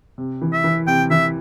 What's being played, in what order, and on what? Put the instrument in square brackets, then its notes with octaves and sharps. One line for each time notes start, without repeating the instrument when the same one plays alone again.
[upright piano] C3
E3
[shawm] E5
[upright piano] E3
[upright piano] C3 [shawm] G5
[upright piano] E3 [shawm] E5